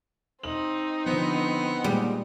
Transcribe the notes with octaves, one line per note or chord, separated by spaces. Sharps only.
C4 D#4 F#7
D3 F3 B3
A#2 G3 G#3